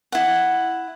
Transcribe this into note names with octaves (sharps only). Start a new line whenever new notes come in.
E4 F#5